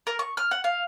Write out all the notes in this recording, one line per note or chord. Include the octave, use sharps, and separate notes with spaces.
A#4
C#6
F6
F#5
F5